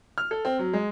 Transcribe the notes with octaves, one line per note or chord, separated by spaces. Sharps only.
F6
A4
C4
F#3
G#3